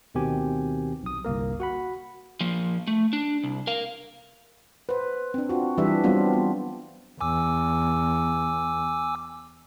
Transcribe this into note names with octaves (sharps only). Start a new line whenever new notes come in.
D2 B2 D#3 C4 G4 G#5
B1 D#6
G1 C2 A#3 A#4
F#4 F#5 B5
F3 A#3
A3
D4
C2
A#4 F5
B4 C5
C4 D4
F4 F#4
E3 G3 D4 G4 B4 E5
F#3 G3 B3 C4 D4 F4
B3
E2 G#5 D6 E6